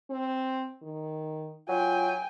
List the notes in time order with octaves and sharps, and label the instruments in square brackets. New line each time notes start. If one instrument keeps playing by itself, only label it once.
[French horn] C4
D#3
[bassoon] F#3 [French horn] F4 [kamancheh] G5 G#5